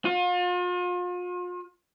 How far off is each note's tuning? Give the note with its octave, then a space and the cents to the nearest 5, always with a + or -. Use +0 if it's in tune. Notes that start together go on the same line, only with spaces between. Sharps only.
F4 +40